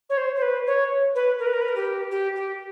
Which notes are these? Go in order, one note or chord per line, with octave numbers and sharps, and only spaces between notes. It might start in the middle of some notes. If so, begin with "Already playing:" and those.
C#5
C5
C5
B4
C#5
B4
A#4
B4
A#4
B4
A#4
G4
G4
G4